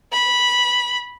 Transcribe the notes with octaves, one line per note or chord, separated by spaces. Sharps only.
B5